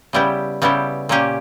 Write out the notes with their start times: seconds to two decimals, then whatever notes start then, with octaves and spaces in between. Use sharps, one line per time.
0.13 C#3 G3 B3 E4 G4
0.62 C#3 G3 B3 E4 G4
1.09 A#2 A#3 C#4 G4